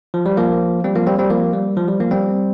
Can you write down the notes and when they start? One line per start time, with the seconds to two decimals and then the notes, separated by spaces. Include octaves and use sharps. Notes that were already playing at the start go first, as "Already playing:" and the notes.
0.14 F3
0.26 G3
0.37 F3 A#3
0.84 G3 C4
0.95 F3 A#3
1.07 G3 C4
1.19 G3 C4
1.30 F3 A#3
1.53 G3
1.77 F3
1.88 G3
2.00 F3 A#3
2.11 G3 C4